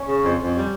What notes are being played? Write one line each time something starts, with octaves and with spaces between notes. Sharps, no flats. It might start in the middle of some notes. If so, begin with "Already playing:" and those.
Already playing: C#4
C#3
F2
F2
G3